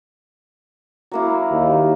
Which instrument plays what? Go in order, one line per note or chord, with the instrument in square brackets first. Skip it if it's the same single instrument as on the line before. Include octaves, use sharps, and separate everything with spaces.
[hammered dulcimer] F#3 A#3 E4
[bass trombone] D#2